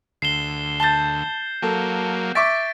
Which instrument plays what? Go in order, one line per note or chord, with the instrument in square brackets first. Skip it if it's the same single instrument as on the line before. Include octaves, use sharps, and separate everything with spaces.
[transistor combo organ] D2 [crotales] C7 E7 G7
[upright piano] A5 A6 [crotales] G6 G7
[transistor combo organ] F#3 A#3 [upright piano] A4 A5
[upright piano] E5 C#6 D6 [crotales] A6 B6 D7